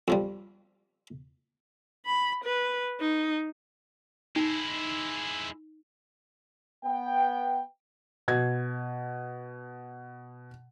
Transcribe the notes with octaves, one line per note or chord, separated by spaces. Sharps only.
F2 F3 G3
B5
B4
D#4
G#3 D#4 E4
B3 G5
B2 G#6